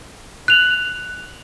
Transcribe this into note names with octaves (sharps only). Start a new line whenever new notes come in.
F#6 F7 F#7